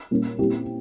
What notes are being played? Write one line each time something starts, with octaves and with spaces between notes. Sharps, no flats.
A#2 G3 A#3 C#4
A#2 G3 C4 E4 G4